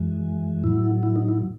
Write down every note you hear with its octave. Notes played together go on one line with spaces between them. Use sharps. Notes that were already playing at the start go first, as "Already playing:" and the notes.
Already playing: F#2 E3 G#3
A2 F#3 E4
E4
D#4
E4